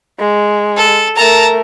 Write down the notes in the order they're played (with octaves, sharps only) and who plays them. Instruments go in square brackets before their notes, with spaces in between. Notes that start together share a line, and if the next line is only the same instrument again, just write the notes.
[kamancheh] G#3
[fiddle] A4
[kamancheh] A3 A#4 [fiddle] A5 A#5